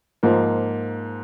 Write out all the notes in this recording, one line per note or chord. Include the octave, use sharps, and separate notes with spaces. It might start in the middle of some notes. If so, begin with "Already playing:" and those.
G#2 F3 A#3